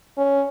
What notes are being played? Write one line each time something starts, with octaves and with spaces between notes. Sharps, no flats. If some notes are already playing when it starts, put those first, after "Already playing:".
C#4